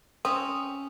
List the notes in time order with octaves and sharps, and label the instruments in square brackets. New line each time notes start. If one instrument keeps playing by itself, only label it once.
[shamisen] C4 [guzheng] C#4 E5 B5 [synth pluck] D#6